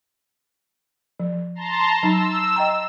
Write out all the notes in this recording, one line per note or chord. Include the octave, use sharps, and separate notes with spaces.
F3
A5 A#5 C6
F#3 D#4 E6
D#5 G5 A#5